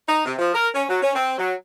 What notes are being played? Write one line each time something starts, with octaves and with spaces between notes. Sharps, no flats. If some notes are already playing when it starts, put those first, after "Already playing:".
D#4
C3
F3
A#4
C#4
F#3
C#4
C4
F#3